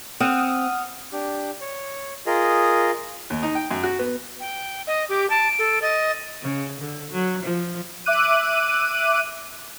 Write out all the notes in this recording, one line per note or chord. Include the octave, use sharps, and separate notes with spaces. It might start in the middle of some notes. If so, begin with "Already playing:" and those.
C4 F#5 D#6 F6
D4 G4
C#5
F4 G#4 A#4 D#5
D#2
D#4
G5
F#2
F#4
B3
G5
D#5 D#6
G4 D6
A5 D7
A4
D#5 A6
C#3
D3
F#3
F3
E5 D6 F#6 D#7